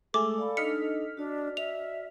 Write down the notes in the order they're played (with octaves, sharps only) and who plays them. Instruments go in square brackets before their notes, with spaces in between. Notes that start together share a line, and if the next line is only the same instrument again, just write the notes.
[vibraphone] G#3 E6 [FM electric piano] A3 G#4 [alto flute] A4 [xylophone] D6
[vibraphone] D5 F5 B5
[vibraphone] D4 D#4 [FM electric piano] D#5 F6 B6 [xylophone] C#7
[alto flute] D4 [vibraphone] F#4 D5
[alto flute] E5 [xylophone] F7